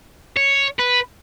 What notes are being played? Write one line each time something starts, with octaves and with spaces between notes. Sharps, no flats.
C#5
B4